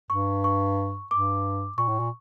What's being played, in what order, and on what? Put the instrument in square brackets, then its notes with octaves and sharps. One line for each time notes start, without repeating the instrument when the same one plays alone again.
[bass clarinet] G2 [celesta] C#6
[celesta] C#6
[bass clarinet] G2 [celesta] D6
[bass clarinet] A#2 [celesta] C#6
[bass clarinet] A2
A#2